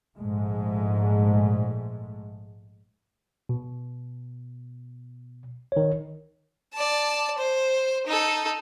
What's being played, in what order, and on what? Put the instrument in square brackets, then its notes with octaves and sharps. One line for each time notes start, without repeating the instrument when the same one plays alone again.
[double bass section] A#1 G#2 G#3 A3
[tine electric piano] B2
D#3 C#5
[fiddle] D5 A5
C5
D#4 A4